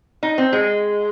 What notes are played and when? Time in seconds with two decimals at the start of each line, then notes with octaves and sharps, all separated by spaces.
0.23 D#4
0.38 C4
0.53 G#3